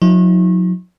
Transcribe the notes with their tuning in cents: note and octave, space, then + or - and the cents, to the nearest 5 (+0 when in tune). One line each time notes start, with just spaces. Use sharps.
F#3 -40 D#4 +40